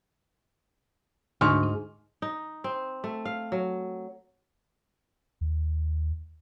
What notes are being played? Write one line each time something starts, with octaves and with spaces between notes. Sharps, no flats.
D2 G#2 C#6 F6
D#4
C4
A3
F5
F#3
D#2